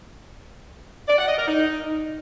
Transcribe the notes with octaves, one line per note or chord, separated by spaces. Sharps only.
D5
F#5
D#5
A#4
D#4